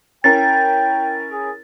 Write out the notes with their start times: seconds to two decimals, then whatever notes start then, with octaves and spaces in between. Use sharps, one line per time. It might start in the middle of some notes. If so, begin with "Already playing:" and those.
0.24 C#4 E4 A#4 G5 A6
1.31 G#4